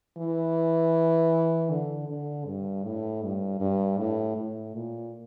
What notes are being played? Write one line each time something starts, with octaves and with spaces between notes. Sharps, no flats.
E3
D3
D3
G2
A2
G2
G2
A2
A2
A#2